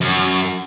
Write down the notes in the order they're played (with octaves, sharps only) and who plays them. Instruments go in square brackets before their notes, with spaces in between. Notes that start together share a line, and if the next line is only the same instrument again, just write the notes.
[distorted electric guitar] F#2